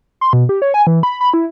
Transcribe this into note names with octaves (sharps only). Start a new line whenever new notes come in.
C6
B2
G4
C#5
G#5
E3
B5
B5
E4